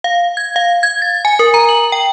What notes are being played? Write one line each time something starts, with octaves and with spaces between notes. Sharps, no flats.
F5
G#6
F5
G#6
A6
G#5
A#4
A#5
F#7
G5